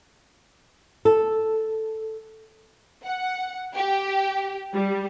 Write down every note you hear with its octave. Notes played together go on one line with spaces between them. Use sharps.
A4
F#5
G4
G3